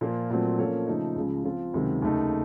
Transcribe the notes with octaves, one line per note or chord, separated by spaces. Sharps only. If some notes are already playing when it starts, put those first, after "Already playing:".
A#2 F3 A#3 F4
A#2 F#3 A3 C4
F3 A#3 C#4 A4 C#5
C#3 F3 A3 D#4
C#2 C#3 F3
F3 C4 F4
C#2 C3 D#3 F#3 C4
D#2 C#3 A3 D#4